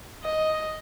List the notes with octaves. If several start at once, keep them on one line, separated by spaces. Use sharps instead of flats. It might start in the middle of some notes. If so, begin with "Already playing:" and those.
D#5